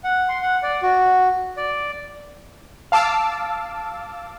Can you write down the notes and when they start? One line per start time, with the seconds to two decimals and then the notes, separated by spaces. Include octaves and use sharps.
0.04 F#5
0.29 C6
0.42 F#5
0.63 D5
0.82 F#4
1.57 D5
2.92 F5 A5 D6 E6